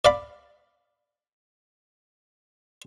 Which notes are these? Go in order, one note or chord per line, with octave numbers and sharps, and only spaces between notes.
D5 F5 B5